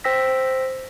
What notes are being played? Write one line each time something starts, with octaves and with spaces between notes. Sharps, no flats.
C5 G5 E6 A#6 B6